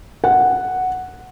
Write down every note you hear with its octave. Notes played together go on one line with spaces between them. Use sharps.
F#5